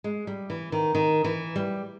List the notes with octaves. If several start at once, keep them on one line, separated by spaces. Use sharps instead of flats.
G#3
G3
E3
D#3
D#3
E3
G3